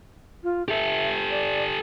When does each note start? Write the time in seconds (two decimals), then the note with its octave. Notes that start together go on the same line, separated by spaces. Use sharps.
0.43 F4
0.68 G4 A4 E5
1.29 D5